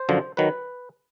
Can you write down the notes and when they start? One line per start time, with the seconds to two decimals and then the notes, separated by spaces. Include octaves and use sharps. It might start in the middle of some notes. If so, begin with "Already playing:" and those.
Already playing: C5
0.09 F#2 D3 F3
0.37 D#3 F#3 B4